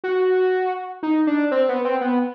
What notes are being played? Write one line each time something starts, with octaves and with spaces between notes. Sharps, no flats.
F#4
D#4
D4
C4
B3
C4
B3